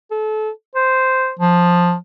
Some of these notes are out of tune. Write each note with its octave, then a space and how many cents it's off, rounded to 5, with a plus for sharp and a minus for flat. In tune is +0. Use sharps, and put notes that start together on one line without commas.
A4 -30
C5 -5
F3 +10